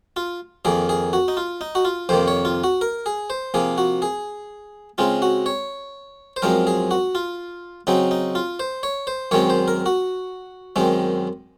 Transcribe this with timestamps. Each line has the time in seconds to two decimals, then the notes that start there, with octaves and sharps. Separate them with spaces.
0.16 F4
0.65 F2 D#3 A#3 G#4
0.89 G#4
1.13 F#4
1.28 D#4
1.37 F4
1.61 D#4
1.75 F#4
1.85 F4
2.09 F2 C3 D#3 A#3 C5
2.28 C#5
2.45 F4
2.64 F#4
2.81 A#4
3.06 G#4
3.30 C5
3.54 C3 F3 A#3 G#4
3.78 F#4
4.02 G#4
4.98 C#3 G#3 C4 F4
5.22 F#4
5.46 C#5
6.36 C5
6.42 F#2 F3 G#3 C4 A#4
6.67 G#4
6.91 F#4
7.15 F4
7.87 C#3 F#3 C4 D#4
8.11 D#4
8.35 F4
8.60 C5
8.83 C#5
9.07 C5
9.31 F#2 D#3 G#3 C4 C#5
9.50 C5
9.68 A#4
9.86 F#4
10.76 F#2 D#3 G#3 C4